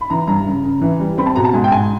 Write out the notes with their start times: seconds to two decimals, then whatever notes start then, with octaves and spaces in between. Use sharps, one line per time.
0.01 B5
0.10 E3 A#5
0.28 G2 A#5
0.47 C#3
0.63 C#3
0.81 E3
1.00 G3
1.18 C4 B5
1.26 A5
1.36 B2 A#5
1.44 A5
1.54 G#2 G#5
1.64 G5
1.72 G#2 G#5